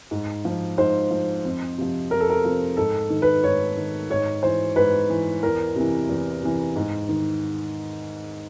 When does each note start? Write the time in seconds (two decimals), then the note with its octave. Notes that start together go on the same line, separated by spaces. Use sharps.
0.11 G#2
0.45 F3
0.78 G#2 C5
1.11 F3
1.45 F2
1.78 C3 F3
2.11 F2 A#4
2.20 A4
2.30 A#4
2.45 C3 F3
2.77 G#2 A4
3.10 D#3
3.22 B4
3.44 G#2 C#5
3.77 D#3
4.10 G#2 C#5
4.43 E3 C5
4.76 G#2 B4
5.10 E3
5.43 E2 A#4
5.76 C3 E3
6.09 E2
6.43 C3 E3
6.76 G#2
7.09 D#3